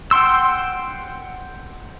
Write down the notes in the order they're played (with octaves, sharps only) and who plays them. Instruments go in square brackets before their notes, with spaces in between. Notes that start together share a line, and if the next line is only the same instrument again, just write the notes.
[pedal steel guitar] F#5 G5 C6 E6